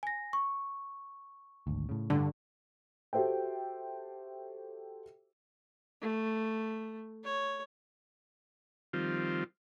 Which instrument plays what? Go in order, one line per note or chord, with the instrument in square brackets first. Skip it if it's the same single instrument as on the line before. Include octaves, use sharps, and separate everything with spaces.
[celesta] G#5 A#6
C#6
[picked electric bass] G#1 D2
A2 C#3
[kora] G2 [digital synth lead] D3
[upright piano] F#4 G4 A4 C5 E5 G5
[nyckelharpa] A3
C#5
[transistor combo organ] D#3 F3 G3 C4 F4